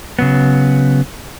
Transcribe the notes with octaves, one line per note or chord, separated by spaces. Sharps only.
C#3 F#3 B3